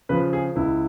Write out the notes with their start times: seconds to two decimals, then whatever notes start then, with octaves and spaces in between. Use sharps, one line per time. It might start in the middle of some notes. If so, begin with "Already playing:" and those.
0.09 C#3 F3 B4
0.33 G#4
0.56 C#2 E4